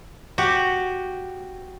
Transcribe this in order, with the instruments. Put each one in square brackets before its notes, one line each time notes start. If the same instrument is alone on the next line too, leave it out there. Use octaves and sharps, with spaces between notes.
[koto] F#4 G4